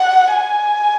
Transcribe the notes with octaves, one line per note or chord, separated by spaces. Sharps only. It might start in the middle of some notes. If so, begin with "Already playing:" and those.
Already playing: F#5
G#5